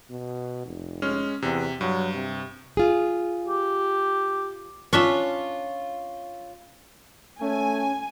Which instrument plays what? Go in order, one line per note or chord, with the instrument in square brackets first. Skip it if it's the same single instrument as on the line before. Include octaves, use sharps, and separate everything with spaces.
[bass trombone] B2
F1
[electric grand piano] G#3 C#4 F6
[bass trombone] E2 [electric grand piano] C3
[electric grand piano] G2 [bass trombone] F#3
[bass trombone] C3
[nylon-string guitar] F4 G#4
[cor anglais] G4
[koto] C#4 D4 E5 [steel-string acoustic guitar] F4 C#5
[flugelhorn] A3 [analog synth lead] C#4 [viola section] G#5